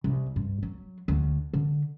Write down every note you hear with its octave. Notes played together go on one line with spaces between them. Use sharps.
C2
G2
F#3
D2
D3